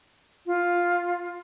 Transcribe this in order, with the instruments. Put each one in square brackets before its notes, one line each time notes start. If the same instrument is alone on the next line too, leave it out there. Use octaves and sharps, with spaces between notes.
[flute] F4